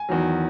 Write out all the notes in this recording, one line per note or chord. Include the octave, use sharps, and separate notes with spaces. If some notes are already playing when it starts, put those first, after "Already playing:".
Already playing: G#5
E2 D#3 F#3